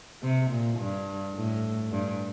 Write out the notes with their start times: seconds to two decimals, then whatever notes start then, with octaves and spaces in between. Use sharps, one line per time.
0.22 C3
0.51 A#2
0.79 G2
1.35 A2
1.91 G2